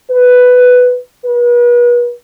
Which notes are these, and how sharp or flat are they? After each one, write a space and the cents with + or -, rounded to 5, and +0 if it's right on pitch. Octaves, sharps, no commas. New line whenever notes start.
B4 +5
B4 -40